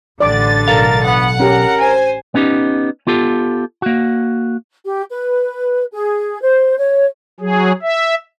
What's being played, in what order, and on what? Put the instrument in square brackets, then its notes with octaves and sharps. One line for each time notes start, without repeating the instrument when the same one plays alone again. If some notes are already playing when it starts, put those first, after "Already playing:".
[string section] A1 D3 A6 [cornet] D4 [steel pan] D5 D6
[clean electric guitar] B1 A4 F5 [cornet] A#4
[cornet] B3 [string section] F#5
[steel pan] C#4 G4 [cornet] A#4
[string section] C5 G#5
[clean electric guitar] B3 C#4 D#4 G4
B3 F4 G4 A4
A#3 F#4
[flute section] G4
B4
G#4
C5
C#5
[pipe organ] F#3 G#4
E5